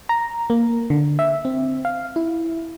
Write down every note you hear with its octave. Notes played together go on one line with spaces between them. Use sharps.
A#5
A#3
D3
E5
C4
F5
E4